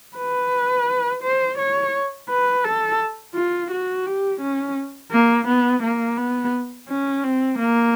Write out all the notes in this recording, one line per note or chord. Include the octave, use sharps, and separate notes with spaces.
B4
C5
C#5
B4
A4
F4
F#4
G4
C#4
A#3
B3
A#3
B3
C#4
C4
A#3